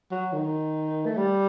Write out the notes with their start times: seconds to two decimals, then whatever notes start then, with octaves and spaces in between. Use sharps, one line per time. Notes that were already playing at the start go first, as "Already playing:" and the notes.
0.11 F#3
0.33 D#3
1.06 A3
1.17 G3